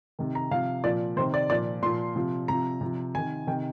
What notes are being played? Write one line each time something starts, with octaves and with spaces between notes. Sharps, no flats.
C3 D#3
A#5
C3 F3 F5
A#2 F3 D5
C3 D#3 C5
D5
A#2 F3 D5
A#2 F3 C6
C3 F3
C3 F3 A#5
C3 F3
C3 D#3 G#5
C3 D#3 G5